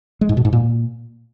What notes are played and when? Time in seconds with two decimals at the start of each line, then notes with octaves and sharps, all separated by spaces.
0.21 G#3
0.29 G#2
0.37 B2
0.45 G#2
0.53 A#2